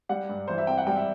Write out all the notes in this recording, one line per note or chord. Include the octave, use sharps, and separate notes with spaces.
G3 F#5
G2
E3 C5
E5
C4 G5
F#5
G3 G5
E5